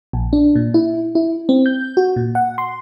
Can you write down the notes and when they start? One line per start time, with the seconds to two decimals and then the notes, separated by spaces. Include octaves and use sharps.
0.13 A#1
0.33 D4
0.55 A#2
0.74 E4
1.15 E4
1.49 C4
1.66 G6
1.97 F#4
2.16 A#2
2.35 F#5
2.58 C6